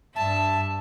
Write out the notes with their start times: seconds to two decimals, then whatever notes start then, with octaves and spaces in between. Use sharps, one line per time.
0.16 G2 E5 A5